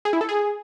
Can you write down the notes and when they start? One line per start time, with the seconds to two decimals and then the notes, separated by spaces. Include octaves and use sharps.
0.05 G#4
0.13 E4
0.21 A4
0.29 G#4